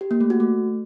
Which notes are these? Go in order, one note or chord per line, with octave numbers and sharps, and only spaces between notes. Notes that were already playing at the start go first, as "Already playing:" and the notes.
G4
A#3
A3
F#4
A3